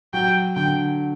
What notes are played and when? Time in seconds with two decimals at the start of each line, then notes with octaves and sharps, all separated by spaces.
0.13 F#3 G5
0.55 D3 G5